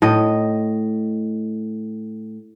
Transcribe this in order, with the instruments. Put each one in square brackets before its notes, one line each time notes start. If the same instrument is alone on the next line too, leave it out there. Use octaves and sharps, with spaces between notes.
[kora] A2 D#5